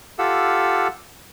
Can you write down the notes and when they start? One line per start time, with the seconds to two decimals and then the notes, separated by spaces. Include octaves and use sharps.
0.19 F4 G4 A4 F5 F#5 E6